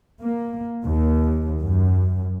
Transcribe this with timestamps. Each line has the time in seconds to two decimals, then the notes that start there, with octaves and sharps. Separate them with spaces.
0.22 A#3
0.84 D#2
1.61 F#2